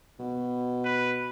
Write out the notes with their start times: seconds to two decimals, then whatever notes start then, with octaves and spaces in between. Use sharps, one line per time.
0.20 B2
0.84 B4